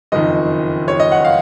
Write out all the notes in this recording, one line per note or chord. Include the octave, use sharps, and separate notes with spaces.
F#1 F2 D#3 D#5
C#5
D#5
F#5
F5